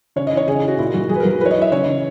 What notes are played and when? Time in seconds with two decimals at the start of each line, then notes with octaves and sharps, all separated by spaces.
0.16 C#3 C#5
0.27 D#5
0.32 E3
0.37 C#5
0.48 C#3 G#4
0.63 E3 F#4
0.78 A#2 E4
0.94 F#3 F#4
1.09 F#3 G#4
1.16 B4
1.20 A#4
1.25 F#3
1.30 A#4
1.40 E3 B4
1.46 C#5
1.51 D#5
1.56 E3
1.62 E5
1.71 C#3 C#5
1.87 C#3